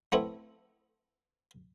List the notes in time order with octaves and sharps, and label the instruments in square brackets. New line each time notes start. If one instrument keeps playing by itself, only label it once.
[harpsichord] A3 B3 C4 E4